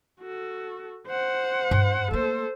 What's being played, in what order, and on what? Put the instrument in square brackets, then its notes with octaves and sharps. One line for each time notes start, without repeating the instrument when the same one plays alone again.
[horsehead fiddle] F#4 A4
C5 F#5
[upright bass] G2
[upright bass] A3 A#3 [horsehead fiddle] A4 C5